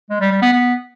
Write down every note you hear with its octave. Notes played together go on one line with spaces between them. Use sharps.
G#3
G3
G3
B3
B3